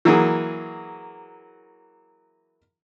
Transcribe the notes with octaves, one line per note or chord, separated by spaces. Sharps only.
E3 F#3 A#3 G#4